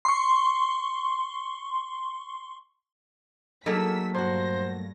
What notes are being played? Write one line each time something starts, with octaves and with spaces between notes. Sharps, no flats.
C6 C#6
F#3 A3 A#3 D#4 G#4 A4 E6 B6
G2 A#2 F#4 C5 A#6